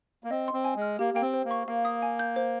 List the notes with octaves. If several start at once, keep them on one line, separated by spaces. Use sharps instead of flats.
A#3
C4 D#5
C6
C4
G#5
G#3
F6
A#3 G4
A#3 G5
C4
C5
A#3
C#6
A#3 F5
D#6
G#5
G6
C5